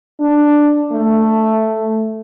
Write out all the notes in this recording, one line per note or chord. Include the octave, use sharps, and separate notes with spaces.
D4
A3